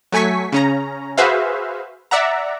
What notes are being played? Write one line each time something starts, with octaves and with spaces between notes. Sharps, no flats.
F#3 A3 G#5 C#6 B6
C#3 C#4 A#5
F#4 G#4 B4 C5 E5 F5
D5 E5 F#5 A#5